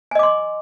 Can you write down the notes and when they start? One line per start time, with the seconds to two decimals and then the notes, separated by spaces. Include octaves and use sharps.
0.11 G#5
0.15 D#5
0.19 D6
0.23 C6